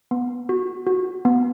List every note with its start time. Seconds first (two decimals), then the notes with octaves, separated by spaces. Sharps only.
0.11 B3
0.49 F#4
0.87 F#4
1.25 B3